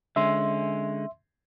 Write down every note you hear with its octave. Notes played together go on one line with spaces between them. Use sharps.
D3 G#3 C#4 E5 C6